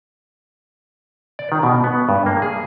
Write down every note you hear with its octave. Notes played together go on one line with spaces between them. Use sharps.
D5
D#3
B2
B3
G2
A#3
G#4